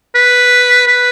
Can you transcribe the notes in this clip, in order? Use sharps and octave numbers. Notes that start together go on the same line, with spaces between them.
B4
B4